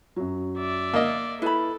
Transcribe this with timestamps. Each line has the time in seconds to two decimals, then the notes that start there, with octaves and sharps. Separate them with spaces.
0.16 F#2 F#3
0.58 D5 E5
0.94 A#3 D#5
1.42 E4 A4 B4 B5